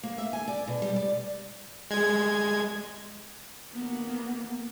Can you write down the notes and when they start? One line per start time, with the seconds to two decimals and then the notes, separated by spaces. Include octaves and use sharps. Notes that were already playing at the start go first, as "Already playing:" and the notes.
0.03 A#3
0.18 E5
0.33 G#5
0.48 D5
0.67 B2
0.82 G3
0.96 D5
1.91 G#3 G#6
3.72 A#3 B3